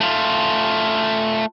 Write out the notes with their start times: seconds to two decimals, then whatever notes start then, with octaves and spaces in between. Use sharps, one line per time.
0.01 A3 F4